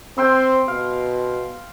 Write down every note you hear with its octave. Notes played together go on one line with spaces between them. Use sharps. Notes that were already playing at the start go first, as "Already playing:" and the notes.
C4 G5 C6 E6
B2 F5